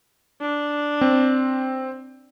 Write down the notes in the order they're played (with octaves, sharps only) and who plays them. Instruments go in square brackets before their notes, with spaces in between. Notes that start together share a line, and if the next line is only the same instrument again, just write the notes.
[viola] D4
[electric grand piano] C4